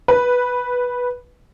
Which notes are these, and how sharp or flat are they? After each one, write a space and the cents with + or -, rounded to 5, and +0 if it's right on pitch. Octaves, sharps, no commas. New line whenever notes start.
B4 -5